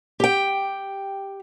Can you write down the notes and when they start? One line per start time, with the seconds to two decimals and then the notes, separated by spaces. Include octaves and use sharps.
0.20 G4 G5